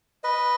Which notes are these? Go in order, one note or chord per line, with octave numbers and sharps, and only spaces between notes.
B4 D#5